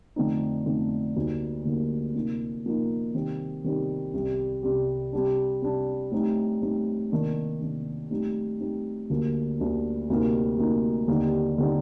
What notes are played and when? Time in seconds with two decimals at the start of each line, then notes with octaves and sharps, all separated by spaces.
0.16 F2 D3 A3 C4 D#4
0.66 F2 D3 A3 C4 D#4
1.16 D2 D3 G3 A#3 D#4
1.65 D2 D3 G3 A#3 D#4
2.15 C3 F3 A#3 D#4
2.65 C3 F3 A#3 D#4
3.14 C3 D#3 G3 C4 D#4
3.64 C3 D#3 G3 C4 D#4
4.14 C2 C3 G3
4.63 C2 C3 G3
5.13 C3 G3 D4
5.62 C3 G3 D4
6.11 A2 G3 C4 D#4
6.61 A2 G3 C4 D#4
7.11 C3 D#3 A#3 D4
7.60 C3 D#3 A#3 D4
8.10 A2 G3 C4 D#4
8.60 A2 G3 C4 D#4
9.09 D2 D3 G3 A#3 D4
9.59 D2 D3 G3 A#3 D4
10.10 D2 C3 G3 A#3 D#4
10.58 D2 C3 G3 A#3 D#4
11.08 D#2 D3 G3 C4 D#4
11.58 D3 G3 C4 D#4